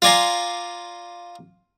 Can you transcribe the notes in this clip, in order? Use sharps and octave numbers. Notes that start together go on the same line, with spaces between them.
F4 D5 G#5 A#5 C6